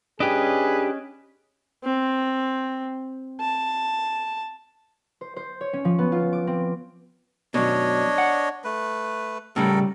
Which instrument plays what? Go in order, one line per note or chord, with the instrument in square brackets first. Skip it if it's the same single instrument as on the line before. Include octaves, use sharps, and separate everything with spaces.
[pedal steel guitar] C#4 D#5 [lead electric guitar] D4 G4 [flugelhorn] G#4 [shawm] B4
[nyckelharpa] C4
A5
[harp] C5
C5
C#5
C#4
F3
B3
F4
D6
C4
[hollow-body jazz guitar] F#2 B2 [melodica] D4 C#5 D#5
[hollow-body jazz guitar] F#5
[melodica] A3 B4
[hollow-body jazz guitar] A2 C#3 G3 [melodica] A4 A#4